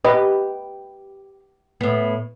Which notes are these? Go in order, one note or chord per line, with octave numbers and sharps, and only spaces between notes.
G4 B4 D#5
A2 B3